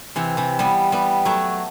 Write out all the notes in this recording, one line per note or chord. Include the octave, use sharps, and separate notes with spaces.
C3 E3
C3 E3
G3 B3
G3 B3
F#3 A3